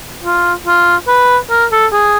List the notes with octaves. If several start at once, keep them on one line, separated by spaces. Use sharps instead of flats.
F4
F4
B4
A#4
A4
G#4